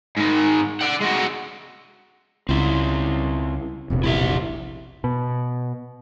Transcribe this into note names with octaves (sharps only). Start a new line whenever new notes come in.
G#2 D#3
D5 F#5
G#3 F#4
C#2 C4 E4
E1 A#1 C3
E4 G4 E5
B2